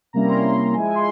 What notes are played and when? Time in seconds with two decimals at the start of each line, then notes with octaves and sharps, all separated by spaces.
0.13 C3 G3 A#3 C#4 E4 A#5
0.29 C6
0.74 F3 G#3 E4 G#5
0.95 C6